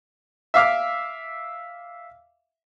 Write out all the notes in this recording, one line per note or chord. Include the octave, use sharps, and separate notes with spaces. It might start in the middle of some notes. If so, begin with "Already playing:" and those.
E5 F5 D6 F6